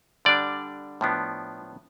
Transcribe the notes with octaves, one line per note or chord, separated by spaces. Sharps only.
D3 G3 D4 D5
A2 F3 B3 D4